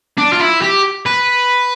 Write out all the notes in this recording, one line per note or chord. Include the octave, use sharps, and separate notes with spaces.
D4
F4
E4
G4
B4